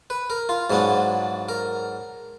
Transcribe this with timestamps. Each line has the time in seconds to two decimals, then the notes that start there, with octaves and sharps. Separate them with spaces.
0.10 B4
0.30 A#4
0.49 F4
0.70 G#2 F#3 B3 D4
1.49 A#4